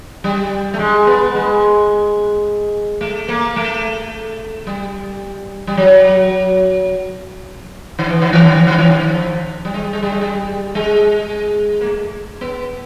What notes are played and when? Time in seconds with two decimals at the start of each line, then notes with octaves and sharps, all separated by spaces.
0.24 G3
0.74 A3
0.79 G#3
1.07 B3
1.35 G#3
3.01 A3
3.28 A#3
3.56 A3
4.67 G3
5.67 G3
5.77 F#3
7.99 D#3
8.10 E3
8.22 D#3
8.33 E3
8.44 D#3
8.56 E3
8.67 D#3
8.78 E3
8.90 D#3
9.09 F3
9.65 G3
9.74 G#3
9.84 G3
9.93 G#3
10.03 G3
10.12 G#3
10.21 G3
10.75 G#3
11.81 A#3
11.86 A3
12.41 B3